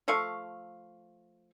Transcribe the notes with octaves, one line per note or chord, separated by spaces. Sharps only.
F3 A3 F5 C#6